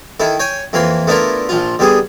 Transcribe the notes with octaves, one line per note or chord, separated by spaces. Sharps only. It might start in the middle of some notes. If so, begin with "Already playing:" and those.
D#3 E4 A4
C#5 G5 G#5
F2 E3 A#3 B5 C6
A3 B3 D4 E4 F4 A#4
A#1 F3 F4
D3 G3 B3 G#4